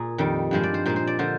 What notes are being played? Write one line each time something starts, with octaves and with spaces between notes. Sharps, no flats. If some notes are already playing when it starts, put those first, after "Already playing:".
Already playing: A#2 G#4
F2 D#3 G3
G2 F3 G#3 C5
D5
C5
A#2 G#3 C5
C5
D5
D3 F3 C5